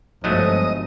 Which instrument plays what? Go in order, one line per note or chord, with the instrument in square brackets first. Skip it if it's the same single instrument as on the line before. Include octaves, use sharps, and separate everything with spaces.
[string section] G1 [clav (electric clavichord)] G#2 F#3 A3 [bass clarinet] F3 [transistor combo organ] D#5